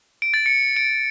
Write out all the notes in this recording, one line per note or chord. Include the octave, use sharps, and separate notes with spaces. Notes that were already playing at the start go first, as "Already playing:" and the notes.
D7
A6
C#7
D7